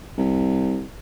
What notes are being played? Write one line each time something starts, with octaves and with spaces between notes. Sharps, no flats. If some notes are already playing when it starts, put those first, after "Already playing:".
C2